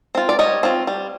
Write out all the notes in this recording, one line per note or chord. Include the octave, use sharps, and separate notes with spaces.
C4 F4
D5
G3 C#5 D#5
C4 F4
G3